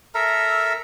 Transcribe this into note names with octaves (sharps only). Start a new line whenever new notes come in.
A4 A#4 E5 A#5